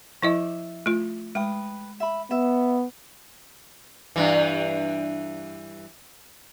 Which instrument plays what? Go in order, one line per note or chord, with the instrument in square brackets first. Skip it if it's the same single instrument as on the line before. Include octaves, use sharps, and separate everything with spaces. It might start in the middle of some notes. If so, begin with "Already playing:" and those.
[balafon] F3 E4 D#5 [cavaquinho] E5 D6
[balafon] A3 F4
[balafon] G#3 [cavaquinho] B4 G5 D#6
[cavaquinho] E5 B5
[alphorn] B3 [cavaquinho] E5
[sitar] G2 E3